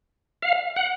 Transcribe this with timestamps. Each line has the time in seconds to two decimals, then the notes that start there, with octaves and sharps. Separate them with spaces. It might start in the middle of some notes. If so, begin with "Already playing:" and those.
0.42 F5
0.76 F#5